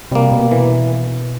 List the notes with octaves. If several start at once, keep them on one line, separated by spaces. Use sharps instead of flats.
C3 G3 A#3
B2
E3